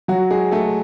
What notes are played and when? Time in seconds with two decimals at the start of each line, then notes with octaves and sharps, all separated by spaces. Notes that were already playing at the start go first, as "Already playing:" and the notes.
0.08 F#3 F#4
0.30 G#3 G#4
0.51 A3 A4